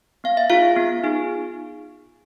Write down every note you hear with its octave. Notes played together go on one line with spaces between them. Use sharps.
B3 F5
E5
D#4 F4 G#4 F5
B3
D#4 G#4